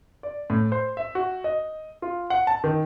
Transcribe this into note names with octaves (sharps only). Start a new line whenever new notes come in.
D5
A2
C5
E5
F#4
D#5
F4
F#5
A5
D#3